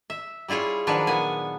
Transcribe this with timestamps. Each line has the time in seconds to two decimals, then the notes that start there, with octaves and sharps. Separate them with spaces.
0.10 E5
0.48 G3 E4 F4 G#4 C#5
0.87 D#3 F3 F#3 D4 B4 C#5
1.07 A#2 B3 G#5